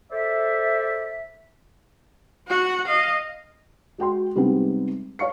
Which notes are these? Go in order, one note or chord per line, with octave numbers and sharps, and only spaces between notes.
A4 C5 D5 E5
F#4 F#5
D#5 F5
G#3 F#4 G5 C6
C3 G3 G#3 B3 C4 D#4
C#5 F5 C#6 C#7